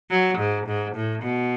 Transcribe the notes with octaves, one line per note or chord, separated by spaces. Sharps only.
F#3
G#2
G#2
A2
B2